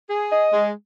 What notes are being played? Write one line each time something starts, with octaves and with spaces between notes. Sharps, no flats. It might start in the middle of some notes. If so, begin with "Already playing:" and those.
G#4
D#5
G#3